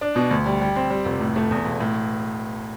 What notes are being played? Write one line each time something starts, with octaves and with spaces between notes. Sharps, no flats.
D4
B2
D2
G3
G3
C4
G3
F1
A2
A3
E2
E1
A2